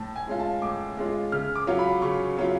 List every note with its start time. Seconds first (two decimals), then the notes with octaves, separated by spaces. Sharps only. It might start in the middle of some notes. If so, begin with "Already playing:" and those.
Already playing: A2 A5
0.16 G#5
0.27 G#3 C#4 F4
0.39 A5
0.62 A2 D6
0.97 G#3 C#4 F4
1.32 C#3 F6
1.56 D6
1.67 F#3 C#4 F4
1.79 B5
2.02 C#3 C#6
2.37 F#3 C#4 F4